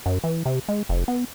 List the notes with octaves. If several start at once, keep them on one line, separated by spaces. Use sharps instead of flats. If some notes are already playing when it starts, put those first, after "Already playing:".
F#2
E3
C3
G#3
F1
B3